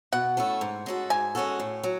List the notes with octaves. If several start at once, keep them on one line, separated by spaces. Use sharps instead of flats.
B2 F#5
A3 C#4 E4 A4
G#2
G#3 C#4 F#4 A4
G#2 G#5
G#3 C#4 F#4 A4
A2
F#3